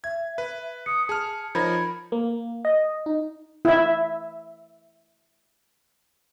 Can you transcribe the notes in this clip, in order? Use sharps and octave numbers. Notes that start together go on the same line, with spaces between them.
E5 G#6
B4
D#6 C#7
G#4 A5 F6
F3 D#4 A#4 C#5 B5 G#6
A#3
D#5
D#4
E4 E5